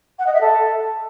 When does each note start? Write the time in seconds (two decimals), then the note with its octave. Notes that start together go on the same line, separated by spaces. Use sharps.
0.18 F#5
0.26 D#5
0.33 E5
0.40 A4